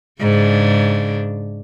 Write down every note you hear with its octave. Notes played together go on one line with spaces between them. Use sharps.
G#2 C#3 D4